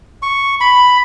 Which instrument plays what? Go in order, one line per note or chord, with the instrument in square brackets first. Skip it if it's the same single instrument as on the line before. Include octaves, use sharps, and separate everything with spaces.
[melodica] C#6
B5